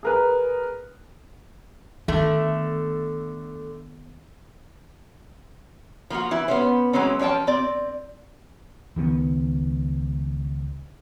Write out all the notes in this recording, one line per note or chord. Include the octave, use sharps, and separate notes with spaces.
G#4 A#4 B4
D3 D#3 A3 B3
F3 A#3 F4 F#4
E3 E4
B3 C#4 C5
E3 F#3 G#3 C4 C#4
F3 C#4 D5 G5 A5
C4 D5
C#2 D#3 F3 B3